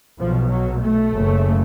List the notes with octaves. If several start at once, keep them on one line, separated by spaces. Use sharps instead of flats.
B1 B2 F3
F#3
A3
F#1 F#2 C#3